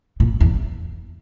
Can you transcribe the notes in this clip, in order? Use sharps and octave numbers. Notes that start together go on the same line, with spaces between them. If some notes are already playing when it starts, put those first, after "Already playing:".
A#2
E2